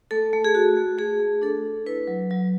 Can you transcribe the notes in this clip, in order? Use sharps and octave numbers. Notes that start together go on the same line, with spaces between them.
A3 A4
A3
G#4
F#4
A3
A3 G#4
A3
D4 A4
A3
E4 B4
F#3
F#3